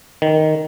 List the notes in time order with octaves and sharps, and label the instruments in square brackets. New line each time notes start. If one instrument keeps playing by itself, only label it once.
[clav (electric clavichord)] D#3